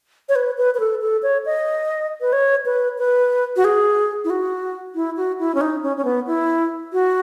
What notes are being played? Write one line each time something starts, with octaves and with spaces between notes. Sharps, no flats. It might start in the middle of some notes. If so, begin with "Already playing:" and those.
C#5
B4
B4
B4
A4
A4
C#5
D#5
B4
C#5
B4
B4
F#4
G#4
E4
F#4
E4
F#4
E4
C#4
D#4
C#4
C#4
B3
E4
F#4